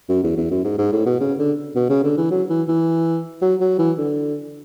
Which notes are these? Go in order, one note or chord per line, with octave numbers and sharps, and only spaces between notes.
F#2
E2
E2
F#2
G#2
G#2
A2
B2
C#3
D3
B2
C#3
D3
E3
F#3
E3
E3
F#3
F#3
E3
D3